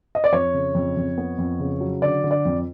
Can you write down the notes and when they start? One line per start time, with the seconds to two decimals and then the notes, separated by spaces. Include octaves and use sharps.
0.15 D#5
0.24 D5
0.32 F2 C#5
0.54 C#3
0.75 F2
0.97 F2
1.18 B3
1.38 F2
1.60 C#3
1.80 F#3
2.02 D3 D5
2.24 D3
2.31 D5
2.45 F2